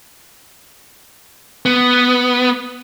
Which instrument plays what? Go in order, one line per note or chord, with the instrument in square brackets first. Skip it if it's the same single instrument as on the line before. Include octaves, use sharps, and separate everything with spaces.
[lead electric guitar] B3